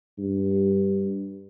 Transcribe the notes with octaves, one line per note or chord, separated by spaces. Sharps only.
G2